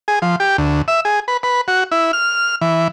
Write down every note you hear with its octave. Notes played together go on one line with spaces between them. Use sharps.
G#4
F3
G4
D2
E5
G#4
B4
B4
F#4
E4
F6
E3